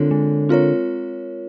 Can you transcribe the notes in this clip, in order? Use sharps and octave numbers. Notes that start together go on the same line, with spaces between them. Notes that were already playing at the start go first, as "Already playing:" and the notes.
Already playing: D3 G#3 C4 F4 A#4 C#5
G#3
C4 F4 A#4 C#5